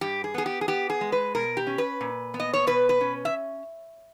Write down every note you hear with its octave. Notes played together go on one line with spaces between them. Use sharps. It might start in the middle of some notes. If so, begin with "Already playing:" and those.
G2 G4
G#4
B3 G#4
G4
G#4
B3 G4
G#4
G#3
B4
B2 A#4
G4
C#4
B4
A#2
B3
D#5
C#5
B2 B4
B4
C#4
E5